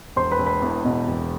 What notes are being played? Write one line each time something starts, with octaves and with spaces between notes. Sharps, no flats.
E1 C5 C6
B4 B5
E1
B4 B5
E2
B2
E1